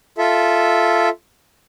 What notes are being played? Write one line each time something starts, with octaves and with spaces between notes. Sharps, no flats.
F4 A4 E5